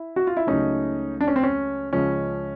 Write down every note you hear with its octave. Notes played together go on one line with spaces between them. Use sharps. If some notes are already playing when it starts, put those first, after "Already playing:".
Already playing: E4
F#4
F4
E4
C#2 C#3 F#3 A3 C#4 D#4
D4
C#4
C4
C#4
C#2 C#3 F3 G#3 C#4